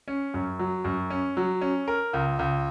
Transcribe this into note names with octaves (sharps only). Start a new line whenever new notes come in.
C#4
F#2
F#3
F#2
C#4
F#3
C#4
A#4
C#2
C#2